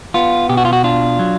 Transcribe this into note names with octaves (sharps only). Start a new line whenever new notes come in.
B3 F4
B2 G4
F#4
F4
F#4
D4 F4
F#3